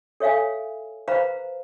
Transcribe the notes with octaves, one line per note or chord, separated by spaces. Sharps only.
A4 C#5 E5 F5 G#5
B4 C5 F5 A#5 B5